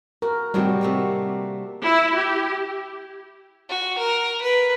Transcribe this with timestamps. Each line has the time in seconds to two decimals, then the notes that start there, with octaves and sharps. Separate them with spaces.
0.22 F#4 A#4
0.54 A2 C3 D#3 G3 F#4 G4
0.81 C3 A3 A#3
1.83 E4
2.14 G4
3.69 F#4
3.98 A#4
4.42 B4